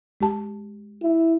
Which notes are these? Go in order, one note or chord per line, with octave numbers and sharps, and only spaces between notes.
G#3 G4 A5
E4